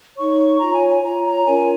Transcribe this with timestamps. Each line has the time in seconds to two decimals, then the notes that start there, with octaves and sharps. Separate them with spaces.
0.16 D#4 C#5 C#6
0.60 F4 C#5 A#5
0.74 G#5
0.88 G#5
1.02 F4 C#5 A#5
1.24 A#5
1.45 C#4 F4 A#4 C#5 G#5